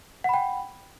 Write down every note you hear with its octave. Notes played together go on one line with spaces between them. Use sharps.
F#5 G5 B5